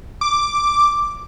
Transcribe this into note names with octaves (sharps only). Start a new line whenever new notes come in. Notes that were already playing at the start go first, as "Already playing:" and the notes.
D6